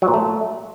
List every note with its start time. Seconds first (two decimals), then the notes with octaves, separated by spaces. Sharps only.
0.02 F#3
0.08 A#2
0.14 A3